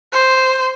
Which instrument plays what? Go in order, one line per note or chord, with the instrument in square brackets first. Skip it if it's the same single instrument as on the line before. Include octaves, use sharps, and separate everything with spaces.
[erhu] C5